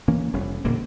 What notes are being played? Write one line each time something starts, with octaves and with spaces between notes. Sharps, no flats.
E3 A#3 C#4
F1 G3 C#4
E1 A#2 D3 A#3